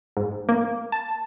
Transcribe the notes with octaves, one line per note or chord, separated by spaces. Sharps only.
G#2
A#3
A5